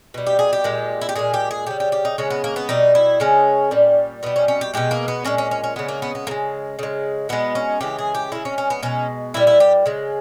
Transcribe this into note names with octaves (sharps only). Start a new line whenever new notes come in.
B2 G3
G4
G#4
G4
A#2 G#3
E4
G4
A#2 G#3 G#4
G4
G#4
C#3 G3 G4
G4
G4
D#4
C#3 G#3 C#4
B3
A#3
B3
B2 G3 D#4
E4
C#3 G#3 C#4
A#2 G3
B2 G3 B3
C#4
C#4
G4
B2 G#3 G4
A#3
B3
A#2 G#3 C#4
C#4
C#4
C#4
C#3 G#3 B3
A#3
B3
B3
C#3 G#3 A#3
C#3 G#3
B2 G#3 B3
C#4
C#3 E3 G#3 G4
G#4
G4
C#3 G#3 E4
C#4
C#4
B3
B2 G#3 C#4
A#2 G3 E4
E4
G4
C#3 G#3